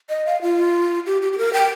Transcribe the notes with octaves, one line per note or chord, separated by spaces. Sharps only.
D#5
F5
F4
G4
G4
G4
A#4
G5